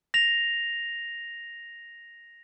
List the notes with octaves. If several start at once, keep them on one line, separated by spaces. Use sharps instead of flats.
A#6 F7